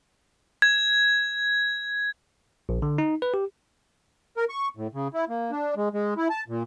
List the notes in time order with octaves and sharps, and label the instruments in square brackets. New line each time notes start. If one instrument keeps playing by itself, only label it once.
[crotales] G#6
[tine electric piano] A#1
D3
D#4
B4
G4
[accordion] A#4
C#6
A2
C#3
E4
A#3
D4
G#3
G#3
E4
A5
A#2